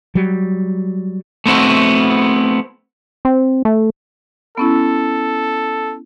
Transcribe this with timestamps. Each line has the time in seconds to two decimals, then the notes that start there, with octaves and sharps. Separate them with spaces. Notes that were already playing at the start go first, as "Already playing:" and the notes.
0.15 F#3 G3
1.46 A3 B3 C4 E4 F#4
3.25 C4
3.65 A3
4.58 B3 C#4 E4 A4